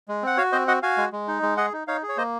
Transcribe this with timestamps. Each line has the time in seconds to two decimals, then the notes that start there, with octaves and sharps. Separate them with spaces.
0.08 G#3
0.23 C4 F#5
0.37 F#4 C#5 F5
0.52 C4 C5 D#5
0.68 F#4 D#5 F#5
0.83 F#4 F5 G#5
0.98 G#3
1.12 G#3
1.28 D#4
1.43 G#3
1.57 G#4 D#5 F#5
1.73 D#4
1.88 D#4 C#5 F5
2.03 G#4
2.09 C#5
2.17 A#3 C5 D#5